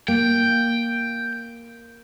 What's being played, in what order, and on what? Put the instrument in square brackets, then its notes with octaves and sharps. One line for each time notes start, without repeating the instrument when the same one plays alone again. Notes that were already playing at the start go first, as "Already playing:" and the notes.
[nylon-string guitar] A#3 [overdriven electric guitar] G5